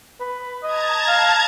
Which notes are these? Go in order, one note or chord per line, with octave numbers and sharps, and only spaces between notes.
B4
D#5 A5 A#5 G#6
F5